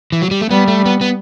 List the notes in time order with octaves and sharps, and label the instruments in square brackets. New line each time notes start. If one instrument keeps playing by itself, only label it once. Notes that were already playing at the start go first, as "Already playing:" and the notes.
[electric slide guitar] E3
F#3
G3
A3
[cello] G3 [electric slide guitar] B3
[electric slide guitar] A3
B3
B3